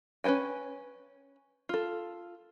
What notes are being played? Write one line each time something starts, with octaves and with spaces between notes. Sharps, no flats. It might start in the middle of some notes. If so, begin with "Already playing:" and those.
C#4 B4 C5 G5 G#5
F4 A4